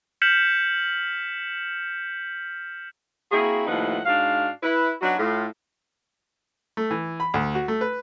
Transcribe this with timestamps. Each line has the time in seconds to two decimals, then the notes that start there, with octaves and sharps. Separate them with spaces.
0.22 F6 G6 B6 C#7 E7 F#7
3.32 A#3 C4 E4 F#4 G#4
3.67 D#2 A2 F3 D#4 B4 F#5
4.06 G#2 D4 F#4 F5
4.63 E4 B4
5.01 F#3 B3 D4 D#4 F#4
5.17 A2 F4
6.77 A3
6.91 E3
7.20 B5
7.34 D2
7.55 F#4
7.68 A3
7.81 B4